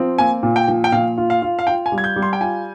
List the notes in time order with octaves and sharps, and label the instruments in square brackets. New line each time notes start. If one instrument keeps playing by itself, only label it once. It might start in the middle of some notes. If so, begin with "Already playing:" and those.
Already playing: [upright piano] F3 C4
[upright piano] A#3 [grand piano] G#5
[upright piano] A#2
[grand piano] G5
[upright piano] F3
[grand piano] G5
[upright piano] A#2 [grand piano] F5
[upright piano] F4
[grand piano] F5
[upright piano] F4
[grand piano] F5
[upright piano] F4 [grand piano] G5
[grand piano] G#5
[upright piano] G3
[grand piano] G#6
G6
[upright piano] G3
[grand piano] C6
G5
[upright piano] F4 [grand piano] G#5